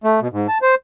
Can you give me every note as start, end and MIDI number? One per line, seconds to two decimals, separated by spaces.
0.04 0.20 57
0.21 0.28 47
0.32 0.47 44
0.48 0.58 81
0.62 0.75 72